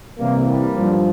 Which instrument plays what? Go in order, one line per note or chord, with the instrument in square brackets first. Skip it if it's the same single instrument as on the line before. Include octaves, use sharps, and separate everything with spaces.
[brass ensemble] C2 C3 E3 G3 A#3
G3 A#3
G2 F3